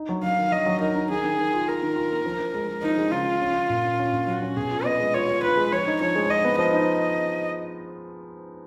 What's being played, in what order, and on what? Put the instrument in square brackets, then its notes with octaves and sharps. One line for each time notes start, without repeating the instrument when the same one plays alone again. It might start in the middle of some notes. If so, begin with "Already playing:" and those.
Already playing: [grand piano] D#4
F#3
[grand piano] F#3 [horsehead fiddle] F5
[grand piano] D#3
[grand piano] F#3 [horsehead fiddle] D#5
[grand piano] F#3
[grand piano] D#4 [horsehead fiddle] A#4
[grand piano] D#4
[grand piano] D#3 [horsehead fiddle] G#4
[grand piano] D#3
D#3
F4
[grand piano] F4 [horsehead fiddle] A#4
[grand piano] D#3
F4
A#3
F3
F3
G#3
G#3
[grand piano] F3 [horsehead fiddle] D#4
[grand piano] G#3
[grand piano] C#3 [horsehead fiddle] F4
[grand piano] C#3
C#4
C#4
A#2
C#4
C#4
A#2
[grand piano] F#3 [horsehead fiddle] F#4
[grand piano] C#4
[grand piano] B2 [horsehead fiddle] G#4
[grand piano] F4
[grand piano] B3 [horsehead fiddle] D#5
[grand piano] G#3
[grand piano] F4 [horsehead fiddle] C#5
[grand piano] F4
[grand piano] F4 [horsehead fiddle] B4
[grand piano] G#3
[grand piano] F3 [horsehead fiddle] C#5
[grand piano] D#4
[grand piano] F3 [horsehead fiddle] C#5
[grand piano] G#3
[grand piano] F3 [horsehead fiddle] D#5
[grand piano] B3
[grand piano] F3 [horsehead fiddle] D#5
[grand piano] D#4